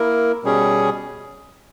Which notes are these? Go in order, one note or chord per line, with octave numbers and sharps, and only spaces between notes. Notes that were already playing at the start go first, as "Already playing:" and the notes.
Already playing: A#3 E4 A#4
B2 G3 C#4 G#4